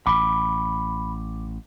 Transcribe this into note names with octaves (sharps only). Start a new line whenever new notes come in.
A1 B5 D6